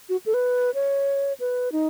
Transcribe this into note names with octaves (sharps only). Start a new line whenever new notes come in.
F#4
A4
B4
C#5
B4
D#4